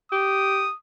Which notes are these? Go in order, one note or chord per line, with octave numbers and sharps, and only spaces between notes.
G4 D#6